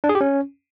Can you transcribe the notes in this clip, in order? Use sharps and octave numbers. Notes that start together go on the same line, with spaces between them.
D4
G#4
G4
C#4